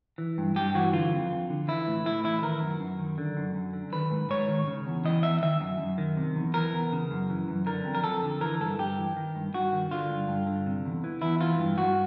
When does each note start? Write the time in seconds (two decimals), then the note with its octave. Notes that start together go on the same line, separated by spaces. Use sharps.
0.18 E3
0.38 G2
0.56 G2 G4
0.75 E3 F#4
0.93 D3 F4
1.12 F2
1.31 F2
1.50 D3
1.68 E3 E4
1.87 A2
2.06 A2 E4
2.25 E3 E4
2.42 D#3 A#4
2.61 F#2
2.80 F#2
2.99 D#3
3.18 D3
3.37 F#2
3.55 F#2
3.73 D3
3.92 D#3 B4
4.11 G#2
4.30 G#2 C#5
4.48 D#3
4.67 C#3
4.87 E2
5.04 E3 D#5
5.23 E2 E5
5.42 D#3 E5
5.61 F#2
5.80 F#2
5.98 D#3
6.17 C3
6.36 E2
6.54 E3 A#4
6.73 E2
6.92 C#3
7.11 F#2
7.30 E3
7.48 F#2
7.66 D3 A#4
7.85 F2
7.95 A#4
8.04 F2 A4
8.23 D3
8.41 E3 A#4
8.61 G2 A4
8.79 G2 G4
8.97 E3
9.17 D#3
9.36 G2
9.54 G2 F#4
9.72 D#3
9.91 D3 F4
10.10 G2
10.28 G2
10.47 D3
10.66 C3
10.85 E2
11.04 E3
11.22 E2 E4
11.41 E3 F4
11.59 G2
11.78 G2 F#4